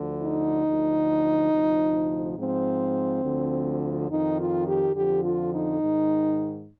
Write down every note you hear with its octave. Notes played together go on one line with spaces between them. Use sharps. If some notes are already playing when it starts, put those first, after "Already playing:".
Already playing: D2 D3 F3
D#4
D2 D3 F3
D2 C3 F3
G#2 F3 C4
D2 D3 F3
F2 D#3 D#4
F4
G4
F2 D3 F3 G4
F4
D#4
G#2 D#3